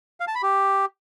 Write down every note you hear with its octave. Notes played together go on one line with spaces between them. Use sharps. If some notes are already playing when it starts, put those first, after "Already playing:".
F5
A5
B5
G4